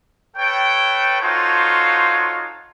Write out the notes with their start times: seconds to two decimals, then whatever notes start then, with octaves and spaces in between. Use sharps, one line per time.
0.37 A4 B4 C#5 G5
1.20 D#4 F4 F#4 A4 C5 C#5